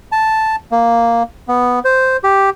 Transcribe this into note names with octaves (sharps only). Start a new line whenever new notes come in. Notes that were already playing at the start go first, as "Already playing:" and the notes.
A5
A#3
B3
C5
G4